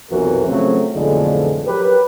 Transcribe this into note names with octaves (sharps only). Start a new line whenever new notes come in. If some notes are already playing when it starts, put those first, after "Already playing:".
B1 F2 C3 E3 F#4 A#4
C#3 F3 F#3 A3 C4
B1 F2 A2 D3 E3 G#3
F#3 G4 A#4 B4